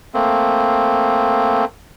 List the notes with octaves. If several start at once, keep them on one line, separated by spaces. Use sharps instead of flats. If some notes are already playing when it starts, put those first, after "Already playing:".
A3 A#3 C4